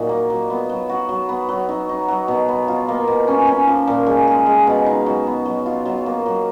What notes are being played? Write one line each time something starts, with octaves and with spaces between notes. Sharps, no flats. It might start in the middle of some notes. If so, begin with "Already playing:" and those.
Already playing: A#2 F#3 D#4
A#3
F#3
B3
F#3
F#4
F#3
B3
F#3
D#4
D#4
F#3
B2
B3
F4
A#3
B2
C#4
C#4
F3
A#2
G#3
G#4
G#3
B2
D#4
F#3
B3
F#3
F4
F#3
A#3
F#3